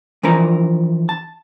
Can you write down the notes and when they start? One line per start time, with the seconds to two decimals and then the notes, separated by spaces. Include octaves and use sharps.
0.23 E3 F3 D4 A#4 A#5
1.09 A5